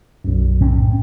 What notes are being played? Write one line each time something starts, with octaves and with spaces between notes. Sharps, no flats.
B1 F#2
A2 C4 C#4